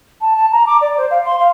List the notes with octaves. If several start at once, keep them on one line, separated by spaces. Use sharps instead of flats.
A5
A5
A#5
D6
D5
C5
F5
C6
F5